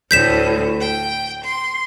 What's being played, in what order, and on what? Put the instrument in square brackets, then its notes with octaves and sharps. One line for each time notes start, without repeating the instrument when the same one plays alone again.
[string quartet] D2 A2 [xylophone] G6 B6 E7
[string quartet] G5
C6